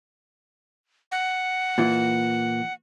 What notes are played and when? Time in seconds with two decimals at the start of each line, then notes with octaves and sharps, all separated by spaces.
1.12 F#5
1.78 A#2 E3